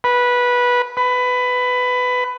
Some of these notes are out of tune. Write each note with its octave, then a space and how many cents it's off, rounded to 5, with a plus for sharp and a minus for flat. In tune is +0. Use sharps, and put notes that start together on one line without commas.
B4 -15
B4 +15